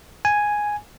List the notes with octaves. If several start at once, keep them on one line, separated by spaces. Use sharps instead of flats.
G#5